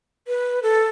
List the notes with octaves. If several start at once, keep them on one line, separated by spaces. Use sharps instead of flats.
B4
A4